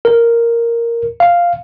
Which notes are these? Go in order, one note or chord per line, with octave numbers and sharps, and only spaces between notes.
A#4
F5